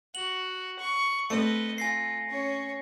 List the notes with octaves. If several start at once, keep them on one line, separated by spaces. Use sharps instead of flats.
F#4 F#7
C#6
A3 C4 B4 D#5 C#7
F4 G#5 A#6 C7
C#4 C#5